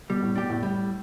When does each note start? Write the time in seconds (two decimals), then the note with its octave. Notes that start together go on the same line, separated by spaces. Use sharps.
0.09 B2 G3
0.23 A2
0.36 B2 D4 G4
0.49 A2
0.63 A2 G3